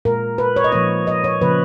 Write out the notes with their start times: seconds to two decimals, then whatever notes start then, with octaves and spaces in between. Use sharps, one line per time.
0.05 A#2 G#3 A#4
0.38 B4
0.56 C#5
0.64 D#5
0.72 A#2 F3 A#3 C#5
1.07 D#5
1.24 C#5
1.41 C#3 F3 A#3 B4